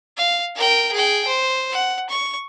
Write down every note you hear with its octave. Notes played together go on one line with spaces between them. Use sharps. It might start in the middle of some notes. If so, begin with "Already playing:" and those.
F5
A#4 G5
G#4 G5
C5
F#5
C#6